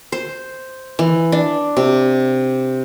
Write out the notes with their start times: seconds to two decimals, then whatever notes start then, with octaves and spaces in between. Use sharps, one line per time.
0.12 C5
0.99 E3
1.32 D4
1.77 C3